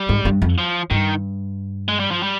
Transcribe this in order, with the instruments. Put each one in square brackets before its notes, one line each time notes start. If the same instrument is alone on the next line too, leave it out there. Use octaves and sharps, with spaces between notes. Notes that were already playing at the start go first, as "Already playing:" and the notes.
Already playing: [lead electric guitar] G3
[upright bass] G#2
G2
F2
[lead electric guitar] F3
[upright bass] G2 [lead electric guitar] D#3
[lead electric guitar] G#3
G3
F3
G3